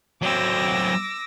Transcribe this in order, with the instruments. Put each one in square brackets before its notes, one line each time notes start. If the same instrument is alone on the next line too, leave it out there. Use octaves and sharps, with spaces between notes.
[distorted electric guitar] F#3 C4 [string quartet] D6 E6 A#6